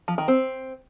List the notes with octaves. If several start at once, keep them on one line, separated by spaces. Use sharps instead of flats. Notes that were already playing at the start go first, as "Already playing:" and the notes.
F3
D#3
C4